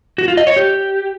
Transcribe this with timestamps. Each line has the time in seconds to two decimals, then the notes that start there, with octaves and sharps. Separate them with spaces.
0.18 F#4
0.28 F4
0.37 D#5
0.47 C#5
0.56 G4